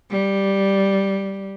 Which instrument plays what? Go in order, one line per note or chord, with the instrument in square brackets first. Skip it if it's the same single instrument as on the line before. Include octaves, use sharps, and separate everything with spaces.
[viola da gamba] G3